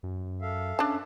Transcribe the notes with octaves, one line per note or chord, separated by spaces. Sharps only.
F#2
A4 E5 F5
C#4 D4 A5